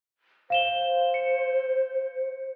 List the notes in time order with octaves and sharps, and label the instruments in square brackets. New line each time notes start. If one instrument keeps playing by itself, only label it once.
[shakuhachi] C5 [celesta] F5 E7 G7
[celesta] C#7